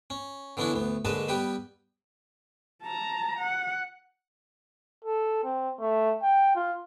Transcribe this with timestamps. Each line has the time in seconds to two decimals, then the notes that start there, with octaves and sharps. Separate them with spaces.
0.10 C#4
0.57 D3 E3 B3 C#4 D4 E4
0.74 D2 B3
1.05 A#1 D3 G#3 B4 D#5 A5
1.29 G3 B3 G4 B4
2.83 A5 A#5
3.39 F#5
5.04 A4
5.44 C4
5.79 A3
6.22 G5
6.56 F4